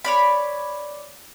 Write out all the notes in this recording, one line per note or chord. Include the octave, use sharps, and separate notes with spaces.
C#5 D5 B5